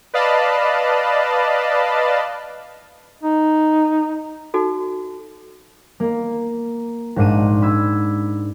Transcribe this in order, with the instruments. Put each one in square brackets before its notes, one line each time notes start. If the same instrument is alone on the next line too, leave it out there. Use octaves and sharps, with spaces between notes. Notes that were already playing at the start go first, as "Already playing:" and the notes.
[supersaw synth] B4 D5 D#5 F5 A5 B5
[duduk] D#4
[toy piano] D#4 F#4 A4
[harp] A#3
A#1 G#2 D4 D#7
B5 E6 G#6